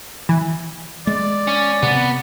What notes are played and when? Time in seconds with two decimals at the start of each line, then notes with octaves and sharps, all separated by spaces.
0.29 E3
1.07 G#3 D5
1.47 C#4
1.83 C3 B3